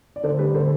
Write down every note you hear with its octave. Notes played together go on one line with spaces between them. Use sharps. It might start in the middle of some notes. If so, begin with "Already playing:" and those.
D5
D3 A4 C5
G3 G4 B4
D3 A4 C5